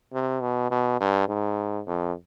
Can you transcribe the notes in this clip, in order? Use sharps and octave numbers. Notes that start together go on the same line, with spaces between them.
C3
B2
B2
G2
G#2
F2